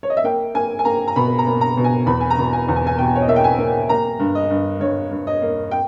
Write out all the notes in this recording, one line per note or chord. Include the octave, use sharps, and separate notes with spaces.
C#5
D#5
E5
A#3 G5
A#3 G#5
G#5
A#3 A#5
A#5
B2 B5
A#5
A#3
A#5
B2
G#5
E2 B5
G#5
A#5
B2
G#5
E2
G#5
G#5
B2 G5
C#5
D#5
A#3 E5
G5
G#5
A#3
A#3 A#5
G2
D#5
G2
G2 C#5
G2
D#5
A#3
G5